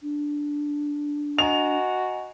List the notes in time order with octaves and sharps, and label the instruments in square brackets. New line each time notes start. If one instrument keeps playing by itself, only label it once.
[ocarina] D4
[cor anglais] F#4 [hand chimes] D#5 G#5 A#5 [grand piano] F7